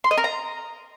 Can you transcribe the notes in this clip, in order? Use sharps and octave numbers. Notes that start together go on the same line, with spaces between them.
C6
D#5
A#4
A#5